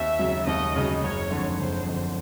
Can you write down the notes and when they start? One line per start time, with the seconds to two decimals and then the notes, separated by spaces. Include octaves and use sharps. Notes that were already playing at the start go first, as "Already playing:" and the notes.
Already playing: D#2 E5
0.19 C#3 F#3
0.47 D#2 D#5
0.76 C#3 F#3
1.03 F#1 C#5
1.31 F2 D3
1.59 F#1 C5
1.86 F2 D3